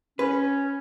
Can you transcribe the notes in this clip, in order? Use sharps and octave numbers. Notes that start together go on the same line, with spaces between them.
C#4 B4